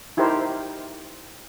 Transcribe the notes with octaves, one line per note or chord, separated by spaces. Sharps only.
D#4 E4 G4 A#4 C5